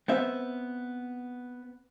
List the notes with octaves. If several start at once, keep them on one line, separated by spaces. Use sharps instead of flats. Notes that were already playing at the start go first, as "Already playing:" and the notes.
B3 C4 E5